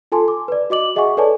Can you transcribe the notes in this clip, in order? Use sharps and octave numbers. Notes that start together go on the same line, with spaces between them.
F4 A4 G#5 A5 C6
D6
B4 D5
F#4 D#5 D6 F#7
G#4 D#5 E5 F#5 G#5 C#6
A4 B4 C#5 D5 G#5 A5